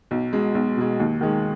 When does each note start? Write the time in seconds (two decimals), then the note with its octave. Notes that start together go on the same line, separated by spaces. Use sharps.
0.11 B1
0.33 B2 G#3
0.55 B1
0.77 B2 G#3
1.00 D#2
1.21 D#3 G#3